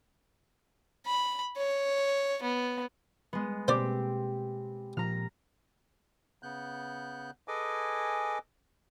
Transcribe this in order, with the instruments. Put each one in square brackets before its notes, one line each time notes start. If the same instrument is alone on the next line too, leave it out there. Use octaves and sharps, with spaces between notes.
[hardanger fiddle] B5
C#5
B3
[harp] G#3 B3
[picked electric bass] B2 A#3 [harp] C4 G4 [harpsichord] C5 D5
[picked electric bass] A#2 F3 A#3 [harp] A#5 F6
[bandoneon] C#3 B3 F#6 G6
G#4 A4 B4 D#5 G#5 D6